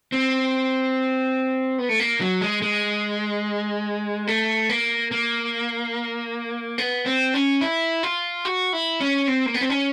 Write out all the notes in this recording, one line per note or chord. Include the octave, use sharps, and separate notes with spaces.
C4
B3
A3
A#3
F#3
G#3
G#3
A3
A#3
A#3
B3
C4
C#4
E4
F4
F#4
E4
C#4
C4
A#3
B3
C4
C#4